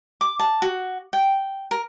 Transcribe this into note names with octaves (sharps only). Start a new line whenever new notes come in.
D6
A5
F#4
G5
A#4